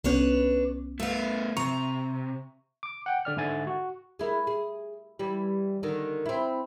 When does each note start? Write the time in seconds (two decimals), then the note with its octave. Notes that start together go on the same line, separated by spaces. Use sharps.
0.04 C2 B3 C#4 D4 B4 C#5
1.00 A3 B3 E5 F5
1.57 C3 A#5 C#6
2.83 D6
3.06 F#5 G5
3.25 D3 D5 F6
3.37 G#2 D3 E5 G#5 A6
3.67 F#4
4.19 G#3 E4 A#4
4.47 G#4
5.19 E3 G3
5.83 D3 D#3
6.26 C4 E4